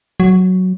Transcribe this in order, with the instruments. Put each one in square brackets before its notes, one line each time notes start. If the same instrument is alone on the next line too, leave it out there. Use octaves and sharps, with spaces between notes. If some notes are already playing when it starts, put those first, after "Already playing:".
[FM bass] F#3